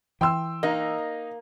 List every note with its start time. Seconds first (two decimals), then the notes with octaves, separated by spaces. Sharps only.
0.21 E3 G5 C6 E6
0.63 A#3 D#4 D#5